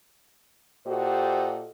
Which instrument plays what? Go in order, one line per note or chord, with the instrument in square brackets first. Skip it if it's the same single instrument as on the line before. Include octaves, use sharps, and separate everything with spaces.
[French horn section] A#2 F#4 G4 A4 C5 D#5